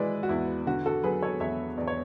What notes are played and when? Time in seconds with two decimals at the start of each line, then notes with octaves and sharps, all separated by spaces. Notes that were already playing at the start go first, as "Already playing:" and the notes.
Already playing: E3 G#3 E4 B4 D5
0.23 F#4
0.29 E2 E4
0.66 D3 F#4
0.86 F#4 A4
1.04 F#3 G#4 B4
1.22 A4 C#5
1.40 E2 C#5 E5
1.78 E2 D5
1.88 C#5